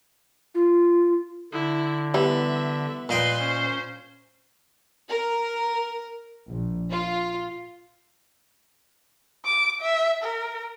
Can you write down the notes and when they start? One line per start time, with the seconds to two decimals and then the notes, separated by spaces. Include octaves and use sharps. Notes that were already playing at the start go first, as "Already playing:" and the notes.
0.55 F4
1.52 D3 E4
2.14 E3 G3 B3 E5
3.09 A#2 B4 D#5 G5 C6
3.39 C#4 C5
5.09 A#4
6.49 A#1
6.91 F4
9.45 D6
9.81 E5
10.23 A#4